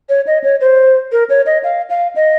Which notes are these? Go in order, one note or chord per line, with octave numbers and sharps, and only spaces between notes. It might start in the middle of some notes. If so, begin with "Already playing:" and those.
C#5
D#5
C#5
C5
A#4
C#5
D#5
F5
F5
D#5